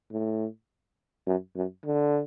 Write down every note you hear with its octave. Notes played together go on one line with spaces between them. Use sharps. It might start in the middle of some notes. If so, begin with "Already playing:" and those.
A2
F#2
F#2
D3